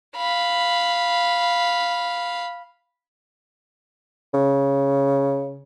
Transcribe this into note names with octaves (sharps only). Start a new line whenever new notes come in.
F5 B5
C#3